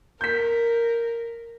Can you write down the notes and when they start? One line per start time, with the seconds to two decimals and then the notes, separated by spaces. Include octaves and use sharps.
0.21 A#4 G6 B6